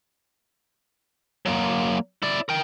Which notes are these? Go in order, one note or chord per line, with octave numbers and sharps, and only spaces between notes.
F#3 A#3
E4 D5
A#4 G5